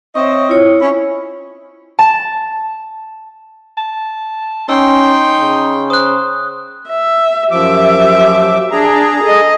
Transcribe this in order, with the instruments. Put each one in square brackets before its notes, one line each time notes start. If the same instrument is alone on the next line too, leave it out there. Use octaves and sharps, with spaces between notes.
[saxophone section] C4 D#5 [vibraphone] C#5 E5 C#6
[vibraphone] E4 F4 C#5
[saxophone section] C#4 E4
[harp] A5
[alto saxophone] A5
[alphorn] C#4 [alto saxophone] D#4 [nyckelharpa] G5 C6 [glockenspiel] E6
[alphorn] C#3
[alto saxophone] C5 [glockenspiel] D#6 F#6
[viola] E5
[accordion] F#2 F3 D6 [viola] G4 E5
[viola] D4 [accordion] G#4 A#5
[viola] A4 D#5